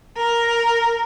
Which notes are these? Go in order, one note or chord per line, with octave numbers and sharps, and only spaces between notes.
A#4